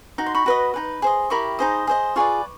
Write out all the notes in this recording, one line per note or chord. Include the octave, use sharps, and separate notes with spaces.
D#4 F#4
C6
B5 C#6
F#4 B4 D#5
D#4 G#4 B4
G#4 C5 D#5
E4 G4 A#4 B5 C#6
D#4 G#4 C5 D#5
G#4 C5 D#5
F4 G#4 B4 D5 C#6